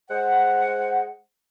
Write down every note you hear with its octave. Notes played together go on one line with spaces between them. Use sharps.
G#3 C5 F#5